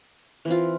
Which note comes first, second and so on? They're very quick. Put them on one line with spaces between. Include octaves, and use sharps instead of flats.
E3 C4 F4